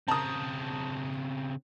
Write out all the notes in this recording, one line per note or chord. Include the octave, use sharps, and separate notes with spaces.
C#3 C4 A5 A#5 D#6